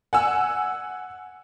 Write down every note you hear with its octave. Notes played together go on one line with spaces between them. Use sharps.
F#5 G#5 E6